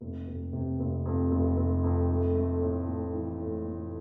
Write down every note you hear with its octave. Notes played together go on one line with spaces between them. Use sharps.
F1
F1
C3
F1
F2
F1
F1
F2
A3
A3
A2
A2
E3
A2
A2